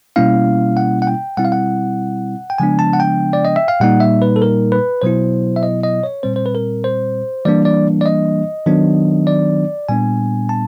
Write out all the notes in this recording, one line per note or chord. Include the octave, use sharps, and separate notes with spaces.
B2 G3 A#3 C#4 E4 F5
F#5
F#5
G5
B2 G3 C4 E4 F#5
F5
F#5
G5
C#3 F3 G#3 B3 D4 G#5
A5
F#5
G5
D5
D#5
E5
F5
A#2 G3 A#3 D#4 F#5
E5
B4
A4
A#4
B4
B2 F#3 B3 E4 C5
E5
D#5
D#5
C#5
A#2 G3 C4 C5
C5
B4
A#4
C5
E3 G3 A#3 D4 D5
D5
D5
D#5
D#3 F#3 B3 D4
D5
A#2 G3 B3 D4 G#5
A5